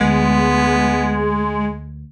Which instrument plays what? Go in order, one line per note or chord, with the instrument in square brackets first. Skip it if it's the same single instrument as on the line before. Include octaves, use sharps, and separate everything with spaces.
[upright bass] D2 [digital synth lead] G#3 [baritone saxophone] B3